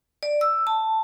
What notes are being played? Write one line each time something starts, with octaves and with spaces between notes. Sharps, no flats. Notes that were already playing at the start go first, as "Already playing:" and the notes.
D5
E6
A5